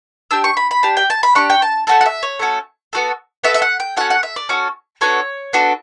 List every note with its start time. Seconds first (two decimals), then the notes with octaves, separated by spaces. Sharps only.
0.31 D4 G4 E6
0.44 C#6
0.57 B5
0.71 B5
0.83 D4 G4 A5
0.97 G5
1.10 A5
1.23 B5
1.35 D4 G4 C#6
1.50 G5
1.62 A5
1.87 A3 C#4 F#4 A4 A5
2.01 F#5
2.06 E5
2.23 C#5
2.39 A3 C#4 F#4 A4
2.93 B3 F#4 A4
3.44 B3 F#4 A4 E5
3.54 E5
3.62 F#5
3.80 G5
3.97 C#4 F#4 A4 F#5
4.10 F#5
4.23 E5
4.36 D5
4.49 C#4 F#4 A4
5.01 B3 D4 F#4 A4 C#5
5.53 B3 D4 F#4 A4